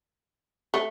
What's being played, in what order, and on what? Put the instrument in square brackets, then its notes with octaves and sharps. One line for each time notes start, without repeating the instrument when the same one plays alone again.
[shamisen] A3